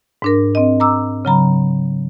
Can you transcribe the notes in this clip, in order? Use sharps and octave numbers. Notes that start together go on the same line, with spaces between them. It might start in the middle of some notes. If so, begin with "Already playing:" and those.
G#2 D4 A#4
C4 D#5
A#5 D6 E6
C#3 F#3 A#5 B5